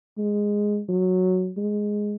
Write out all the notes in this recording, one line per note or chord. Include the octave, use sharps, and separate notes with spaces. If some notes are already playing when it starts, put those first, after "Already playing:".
G#3
F#3
G#3